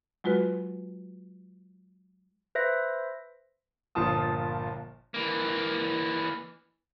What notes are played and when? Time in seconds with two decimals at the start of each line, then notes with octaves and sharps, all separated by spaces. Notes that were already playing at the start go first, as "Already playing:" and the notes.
0.24 F#3 G#3 F4 F#4 B4
2.55 B4 C5 E5 A#6
3.95 G1 A#2 F3 F4 A5 D#6
5.14 E3 A#3